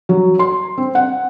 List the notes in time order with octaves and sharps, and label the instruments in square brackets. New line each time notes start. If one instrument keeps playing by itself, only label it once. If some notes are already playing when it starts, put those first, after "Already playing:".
[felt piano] F#3
C6
C4
F#5